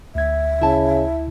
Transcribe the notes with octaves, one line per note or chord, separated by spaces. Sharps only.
D2 E5 G#6
C#3 E4 A5